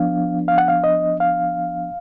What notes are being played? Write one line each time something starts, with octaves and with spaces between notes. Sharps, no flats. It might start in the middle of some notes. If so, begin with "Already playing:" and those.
Already playing: F3 B3 D4 F5
F5
F#5
F5
D#5
F5